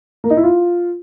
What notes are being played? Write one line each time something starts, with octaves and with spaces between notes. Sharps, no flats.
A#3
D#4
E4
F4